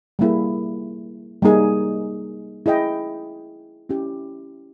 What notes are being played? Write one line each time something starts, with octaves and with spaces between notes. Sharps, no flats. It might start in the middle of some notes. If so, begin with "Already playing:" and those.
G3 A#3 E4 G#4
G3 A#3 D#4 G#4
E4 G#4 D#5 G5
C#4 E4 G4